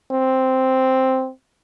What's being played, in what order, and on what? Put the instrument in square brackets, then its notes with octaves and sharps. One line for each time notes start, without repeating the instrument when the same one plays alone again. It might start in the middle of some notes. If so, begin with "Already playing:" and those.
[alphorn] C4